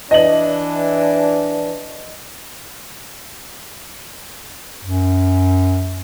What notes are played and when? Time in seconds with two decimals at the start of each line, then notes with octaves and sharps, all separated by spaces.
0.11 E3 D4 D#5 F#7
4.84 F#2